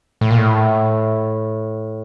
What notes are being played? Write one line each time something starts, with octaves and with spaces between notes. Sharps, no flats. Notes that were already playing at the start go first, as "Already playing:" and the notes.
A2
A#2
A2